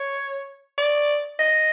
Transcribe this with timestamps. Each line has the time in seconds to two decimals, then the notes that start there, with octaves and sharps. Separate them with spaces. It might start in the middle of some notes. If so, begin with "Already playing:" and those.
Already playing: C#5
0.78 D5
1.39 D#5